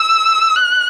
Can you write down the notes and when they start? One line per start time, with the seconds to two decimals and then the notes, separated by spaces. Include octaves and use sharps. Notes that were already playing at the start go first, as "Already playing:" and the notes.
Already playing: E6
0.56 F#6